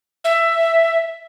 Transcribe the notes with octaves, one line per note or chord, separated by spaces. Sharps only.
E5